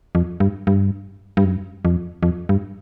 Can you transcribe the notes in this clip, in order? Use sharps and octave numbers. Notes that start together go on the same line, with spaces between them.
F2
G2
G2
G2
F#2
F2
F2
G2